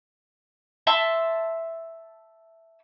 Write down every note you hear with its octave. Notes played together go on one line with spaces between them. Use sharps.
E5 A5 C6 E6